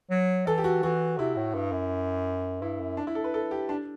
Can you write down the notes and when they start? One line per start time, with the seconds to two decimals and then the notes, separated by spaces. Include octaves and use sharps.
0.11 F#3
0.47 E3 A4
0.58 G4
0.64 F#4
0.83 E3 F#4
1.18 C3 E4
1.36 A2
1.55 G2
1.72 F#2
2.62 G2 E4
2.80 F#2
2.97 D4
3.07 E4
3.15 A4
3.24 B4
3.34 A4
3.51 G4
3.69 D4